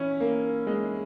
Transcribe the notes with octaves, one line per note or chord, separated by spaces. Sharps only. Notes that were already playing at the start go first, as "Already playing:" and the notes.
Already playing: E3 C#4 E4
A#3
G#3